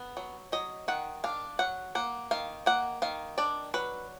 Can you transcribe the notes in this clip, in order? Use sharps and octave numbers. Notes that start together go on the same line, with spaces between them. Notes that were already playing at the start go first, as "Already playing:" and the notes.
Already playing: B3
F#3
F#3 D#5
D#3 F#5
D4 F5
F#3 F#5
A#3 F#5
D#3 F5
A#3 F#5
D#3 F5
D4 D5
F#3 B4